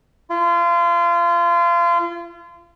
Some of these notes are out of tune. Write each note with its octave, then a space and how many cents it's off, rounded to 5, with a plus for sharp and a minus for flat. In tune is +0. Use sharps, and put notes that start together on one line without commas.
F4 -30